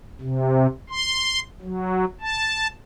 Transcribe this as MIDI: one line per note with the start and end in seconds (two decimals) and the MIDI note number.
0.21 0.67 48
0.90 1.40 84
1.62 2.05 54
2.21 2.67 81